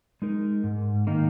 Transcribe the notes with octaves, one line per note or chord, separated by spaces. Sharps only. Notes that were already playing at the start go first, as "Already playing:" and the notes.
G#3 D#4 A#4
G#2
D#3 A#3 D#4